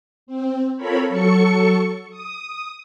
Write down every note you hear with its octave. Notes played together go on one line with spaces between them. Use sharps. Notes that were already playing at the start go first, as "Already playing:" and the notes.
C4
C4 F4 A4 A#4 C#5 B5
F#3 A4 C#6 C#7
D#6